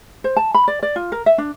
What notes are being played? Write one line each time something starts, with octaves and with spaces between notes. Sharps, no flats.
C5
A5
B5
D5
D5
F4
A#4
E5
D4